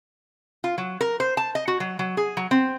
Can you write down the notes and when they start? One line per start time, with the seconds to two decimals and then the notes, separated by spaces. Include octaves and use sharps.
0.64 F4
0.78 F#3
1.01 A#4
1.20 C5
1.37 A5
1.55 D#5
1.68 F#4
1.80 F#3
1.99 F#3
2.17 G#4
2.37 F#3
2.51 C4